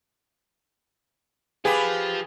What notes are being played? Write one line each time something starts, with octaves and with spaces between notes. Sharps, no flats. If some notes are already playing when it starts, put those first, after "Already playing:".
F3 F4 G4 G#4 B4